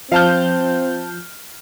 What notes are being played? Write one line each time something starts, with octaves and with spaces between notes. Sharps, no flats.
F3 C4 F5 A5 F6 G6